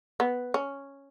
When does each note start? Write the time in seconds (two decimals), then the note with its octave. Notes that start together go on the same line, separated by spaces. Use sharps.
0.20 B3
0.54 C#4